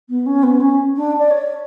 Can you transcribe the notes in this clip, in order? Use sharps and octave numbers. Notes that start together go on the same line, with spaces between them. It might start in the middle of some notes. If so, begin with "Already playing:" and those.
B3
C#4
B3
C#4
D4
D5
C#5